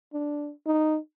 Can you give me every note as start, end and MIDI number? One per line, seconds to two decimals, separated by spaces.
0.14 0.51 62
0.66 0.99 63